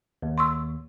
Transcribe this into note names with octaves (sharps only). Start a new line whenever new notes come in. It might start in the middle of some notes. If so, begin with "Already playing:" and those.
D#2
C6 C#6 E6